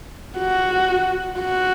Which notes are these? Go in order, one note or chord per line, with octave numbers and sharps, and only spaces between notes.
F#4
F#4